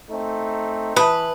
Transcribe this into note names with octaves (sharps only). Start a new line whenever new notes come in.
A3 C4 D#4
E3 B4 A5 D#6